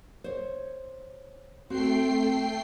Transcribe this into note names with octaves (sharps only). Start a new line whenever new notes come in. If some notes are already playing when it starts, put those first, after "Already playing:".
C5 C#5
A3 C4 F#4 G5 C7